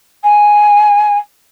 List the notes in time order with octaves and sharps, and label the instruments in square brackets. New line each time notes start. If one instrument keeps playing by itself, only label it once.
[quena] G#5